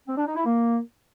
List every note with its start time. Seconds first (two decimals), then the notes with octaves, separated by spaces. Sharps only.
0.07 C4
0.17 D4
0.26 D#4
0.36 E4
0.45 A#3